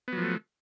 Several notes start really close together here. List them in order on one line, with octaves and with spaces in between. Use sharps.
B3 F#3 F3 A3